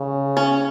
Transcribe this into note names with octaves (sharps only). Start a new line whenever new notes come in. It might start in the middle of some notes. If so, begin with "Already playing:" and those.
Already playing: C#3
C#4